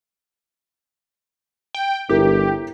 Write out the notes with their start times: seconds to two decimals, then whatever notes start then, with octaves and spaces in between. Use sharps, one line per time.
1.75 G5
2.09 G1 E4 G4 A#4